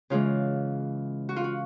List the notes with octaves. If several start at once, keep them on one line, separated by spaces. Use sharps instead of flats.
C#3 E3 G#3 F4
F#4
F4
F#4